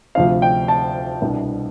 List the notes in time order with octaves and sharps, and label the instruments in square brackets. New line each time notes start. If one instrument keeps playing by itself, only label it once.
[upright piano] D2 C3 F3 C4 F5
G5
A5
C2 B2 B3 D4